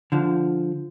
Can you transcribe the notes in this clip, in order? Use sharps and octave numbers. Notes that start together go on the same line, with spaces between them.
D3 F3